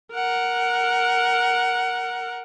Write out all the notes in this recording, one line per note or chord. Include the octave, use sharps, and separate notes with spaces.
A#4 F#5